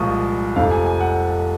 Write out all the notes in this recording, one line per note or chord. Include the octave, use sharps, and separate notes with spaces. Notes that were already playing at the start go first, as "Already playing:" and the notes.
Already playing: C2 A#2 F3 G#3 C#6 D#6
F1 F2 C3 F3 F5
G#5
G#5
F#5